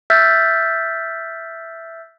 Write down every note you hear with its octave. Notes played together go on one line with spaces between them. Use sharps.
E5 E6 F6 G6 A6 B6